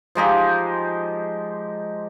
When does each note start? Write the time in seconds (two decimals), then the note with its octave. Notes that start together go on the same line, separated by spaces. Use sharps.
0.15 F3 G#3 D#4 G4